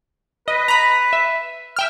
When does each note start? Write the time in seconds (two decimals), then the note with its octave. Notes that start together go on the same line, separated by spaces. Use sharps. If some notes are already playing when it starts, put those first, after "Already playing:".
0.48 B4 D#5
0.68 A#5 B5
1.13 E5
1.76 E5 G5 F6